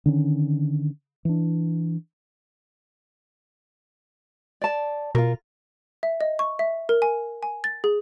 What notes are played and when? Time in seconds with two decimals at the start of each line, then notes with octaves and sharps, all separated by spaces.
0.06 D3 D#3 C#4
1.25 E3 D4
4.61 D5 A5
5.15 B2 F4 A#4
6.03 E5
6.21 D#5
6.39 C#6
6.59 E5
6.89 A#4
7.02 G#5
7.43 G#5
7.64 A6
7.84 G#4